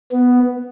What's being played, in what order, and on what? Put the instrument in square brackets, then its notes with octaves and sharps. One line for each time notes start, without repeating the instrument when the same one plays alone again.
[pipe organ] B3